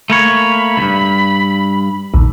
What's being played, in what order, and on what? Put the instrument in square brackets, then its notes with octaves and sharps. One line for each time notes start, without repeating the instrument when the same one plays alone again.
[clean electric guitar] A3 A#3 C#5 [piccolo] B5
[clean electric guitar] C#2 G2
[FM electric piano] A#1 D#2